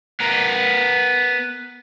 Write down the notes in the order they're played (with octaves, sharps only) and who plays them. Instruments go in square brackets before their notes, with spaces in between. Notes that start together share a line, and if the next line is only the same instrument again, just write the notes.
[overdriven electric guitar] B3 A#4